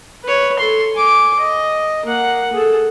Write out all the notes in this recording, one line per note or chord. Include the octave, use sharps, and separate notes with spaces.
B4 C#5
A4 C6
G#5 D6
D#5
A#3 F#5
G#4 A4